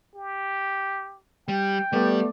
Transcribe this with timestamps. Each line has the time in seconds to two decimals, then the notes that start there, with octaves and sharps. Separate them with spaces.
0.16 G4
1.48 G3 G5
1.93 G3 A3 B3 D5